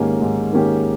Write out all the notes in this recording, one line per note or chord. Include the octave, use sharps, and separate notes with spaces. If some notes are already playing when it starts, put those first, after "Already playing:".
Already playing: G#2 D#3 A#3 C#4 G4
G#2
D#3 A#3 C#4 G4